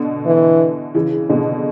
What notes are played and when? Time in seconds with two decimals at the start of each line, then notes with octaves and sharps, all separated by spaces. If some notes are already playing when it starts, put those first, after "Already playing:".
Already playing: B2 D3
0.26 E3
0.95 C#3 E3
1.29 B2 D3